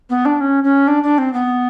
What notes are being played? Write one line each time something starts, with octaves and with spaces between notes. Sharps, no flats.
B3
D4
C#4
C#4
D4
D4
C4
B3